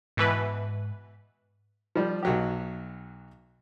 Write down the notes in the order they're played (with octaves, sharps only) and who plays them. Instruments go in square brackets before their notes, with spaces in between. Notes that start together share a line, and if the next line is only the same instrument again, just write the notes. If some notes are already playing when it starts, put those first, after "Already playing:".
[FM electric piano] G#2 [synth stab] B2 E3 B4
[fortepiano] F3 G3
B1 F#3 G4